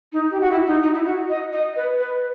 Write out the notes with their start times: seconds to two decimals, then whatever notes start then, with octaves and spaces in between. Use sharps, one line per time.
0.13 D#4
0.31 G4
0.41 F#4
0.51 E4
0.67 D#4
0.83 D#4
0.95 E4
1.05 F#4
1.29 D#5
1.53 D#5
1.76 B4
1.99 B4